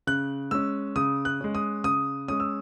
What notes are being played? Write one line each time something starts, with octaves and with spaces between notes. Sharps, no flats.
C#3 F#6
G#3 C#4 E6
C#3 D#6
F#6
G#3 C#4
D#6
C#3 D#6
G#3 C#4 D#6
E6